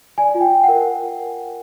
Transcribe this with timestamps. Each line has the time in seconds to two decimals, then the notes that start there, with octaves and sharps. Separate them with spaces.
0.18 D5 G#5
0.34 F4
0.41 G5
0.52 F4
0.64 A#4 F#5